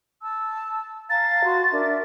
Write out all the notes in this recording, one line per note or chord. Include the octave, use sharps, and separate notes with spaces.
A5 E6
F5 A5 A#5 A6
F#4 C6
D4 A#4 E5